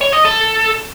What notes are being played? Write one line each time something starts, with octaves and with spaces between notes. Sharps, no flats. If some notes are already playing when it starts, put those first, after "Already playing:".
C#5
D#5
A4